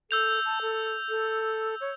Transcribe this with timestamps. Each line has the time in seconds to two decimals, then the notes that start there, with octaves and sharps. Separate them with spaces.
0.11 A4 E6 G6 F7
0.45 A5
0.62 A4
1.09 A4
1.81 C#5